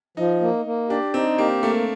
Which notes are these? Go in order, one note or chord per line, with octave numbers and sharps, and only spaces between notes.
F3 D#4
A#3
A#3
D4 G4
C4 D#4
A#3 G4
A3 A#3